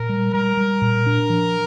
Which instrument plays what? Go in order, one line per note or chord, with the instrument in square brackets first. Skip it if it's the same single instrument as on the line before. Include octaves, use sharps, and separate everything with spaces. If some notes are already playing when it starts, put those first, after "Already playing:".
Already playing: [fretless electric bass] A#2 [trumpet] A#4
[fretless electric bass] G3
[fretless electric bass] G3 [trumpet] A#4
[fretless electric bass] G3
A#2
D4
F3